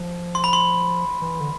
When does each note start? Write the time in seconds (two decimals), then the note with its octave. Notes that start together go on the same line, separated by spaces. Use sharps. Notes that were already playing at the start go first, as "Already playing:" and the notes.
Already playing: F3
0.35 C6
0.44 B5
0.53 C6
1.22 E3
1.40 D3